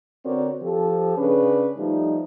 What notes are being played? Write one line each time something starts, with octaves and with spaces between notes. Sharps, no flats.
D3 C4 F#4 A#4 C#5 D5
F3 G4 A4
C#3 C#4 D4 G#4 B4 D5
F3 G3 A3 D#4